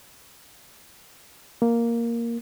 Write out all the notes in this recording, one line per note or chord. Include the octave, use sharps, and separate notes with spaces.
A#3